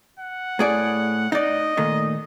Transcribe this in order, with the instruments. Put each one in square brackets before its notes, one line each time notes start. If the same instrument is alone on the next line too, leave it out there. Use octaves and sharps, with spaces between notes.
[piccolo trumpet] F#5
[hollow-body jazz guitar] A2 G#4 D5
[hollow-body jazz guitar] D#4 D5 [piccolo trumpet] D#5
[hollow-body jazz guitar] A#2 D#3 A3